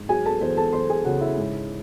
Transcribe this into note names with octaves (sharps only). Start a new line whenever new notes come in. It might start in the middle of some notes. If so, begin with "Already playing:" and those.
Already playing: G#2
F#3 G#4 G#5
A4 A5
E2 C5
A4 A5
E2 C5 C6
G#4 G#5
C#3 F#4 F#5
E4 E5
G#2